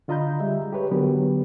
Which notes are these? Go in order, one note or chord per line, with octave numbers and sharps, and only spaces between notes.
D3 F4 D#5 A#5 B5 G6
G3 G#3 E5
G4 G#4 B4 C#5
D3 F#3 B3 G4 A#4 B4